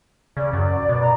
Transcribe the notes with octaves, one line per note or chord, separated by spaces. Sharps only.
C#3 D5
F#2
B2
A#5